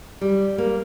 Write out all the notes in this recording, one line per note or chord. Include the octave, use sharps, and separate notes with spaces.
G3
A#3